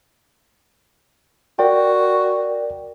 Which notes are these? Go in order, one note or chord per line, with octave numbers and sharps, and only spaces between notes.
F#4 A#4 D5 G5